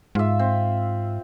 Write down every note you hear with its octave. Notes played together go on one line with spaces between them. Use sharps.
G#2 F4 E5
C4